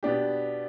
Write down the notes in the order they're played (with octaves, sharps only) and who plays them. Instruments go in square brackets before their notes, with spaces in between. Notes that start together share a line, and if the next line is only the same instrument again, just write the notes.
[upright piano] B2 B3 D4 G4